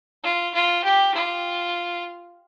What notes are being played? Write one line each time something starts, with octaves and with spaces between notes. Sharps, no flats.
F4
F4
G4
F4